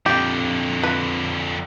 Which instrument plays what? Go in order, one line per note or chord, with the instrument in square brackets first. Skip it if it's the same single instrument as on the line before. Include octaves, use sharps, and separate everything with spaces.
[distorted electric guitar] F2 D3 [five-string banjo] G4
[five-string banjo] B4